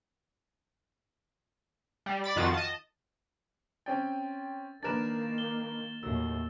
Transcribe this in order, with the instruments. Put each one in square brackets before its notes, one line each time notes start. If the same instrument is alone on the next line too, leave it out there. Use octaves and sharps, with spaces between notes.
[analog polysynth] G3
D5 B5 A6
F2 D#3 F4 F#4 A6
D#5 A5
[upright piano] C4 C#4 G5 [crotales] A6
[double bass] D#3 A#3 [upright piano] D4 A#4 B4 [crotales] A6 E7
[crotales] G7
[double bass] D#2 A2 [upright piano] F#3 [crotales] E6